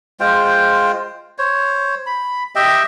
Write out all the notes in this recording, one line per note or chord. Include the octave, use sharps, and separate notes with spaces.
G#3 F4 C5 G5
C5 C#5
B5
G4 D#5 E5 G5